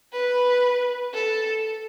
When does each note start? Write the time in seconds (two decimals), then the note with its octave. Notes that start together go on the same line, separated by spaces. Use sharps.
0.13 B4
1.14 A4